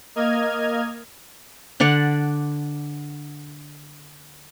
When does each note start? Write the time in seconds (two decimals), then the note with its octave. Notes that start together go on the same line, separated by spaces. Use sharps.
0.16 A#3 D#5 F6 G#6
1.80 D3 D4 D5 F#5